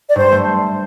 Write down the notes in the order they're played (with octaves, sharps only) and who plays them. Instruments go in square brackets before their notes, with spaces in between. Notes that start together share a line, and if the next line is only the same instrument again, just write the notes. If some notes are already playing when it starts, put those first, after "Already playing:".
[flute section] D5
[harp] G2 [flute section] C5
[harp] A3